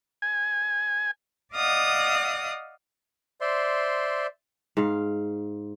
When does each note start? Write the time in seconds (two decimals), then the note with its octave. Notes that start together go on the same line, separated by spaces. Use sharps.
0.22 G#5
1.54 D5 D#5 F5 F#5 D#6
3.41 C5 D5 E5 C6
4.77 G#2 F5